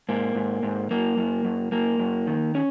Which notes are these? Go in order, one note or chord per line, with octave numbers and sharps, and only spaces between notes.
G#2 A#3
G#2
G#2
F#2 A#3
F#2
F#2
F#2 A#3
F#2
D#3
C#4